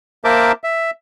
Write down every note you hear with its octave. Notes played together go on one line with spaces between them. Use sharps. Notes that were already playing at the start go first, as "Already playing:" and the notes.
A#3 A#4 C5 E5 A5 D6
E5